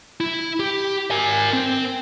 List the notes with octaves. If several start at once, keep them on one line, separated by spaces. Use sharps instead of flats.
E4
G4
A#4 G#5
C4